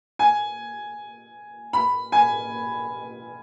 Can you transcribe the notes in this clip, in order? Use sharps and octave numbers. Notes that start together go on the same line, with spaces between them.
G#5
B5
G#5